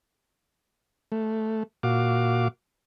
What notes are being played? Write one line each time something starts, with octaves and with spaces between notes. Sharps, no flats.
A3
A#2 F#4 F5 D6